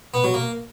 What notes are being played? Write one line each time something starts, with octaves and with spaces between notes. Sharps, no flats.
B3
F#3
A#3